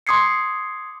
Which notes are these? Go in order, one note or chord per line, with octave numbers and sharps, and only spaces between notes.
C6 D6 D#6 G#6 C7 C#7